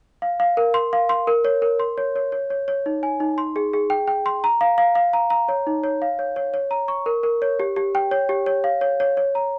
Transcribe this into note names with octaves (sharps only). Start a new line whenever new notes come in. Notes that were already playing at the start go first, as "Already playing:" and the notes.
F5
F5
A#4
C6
F5
C6
A#4
C#5
A#4
C6
C#5
C#5
C#5
C#5
C#5
D#4
G#5
D#4
C6
G#4
G#4
G5
G5
C6
A#5
F5
F5
F5
A#5
A#5
C#5
D#4
C#5
F5
C#5
C#5
C#5
A#5
C#6
A#4
A#4
C#5
G4
G4
G5
C#5
G4
C#5
F5
C#5
C#5
C#5
A#5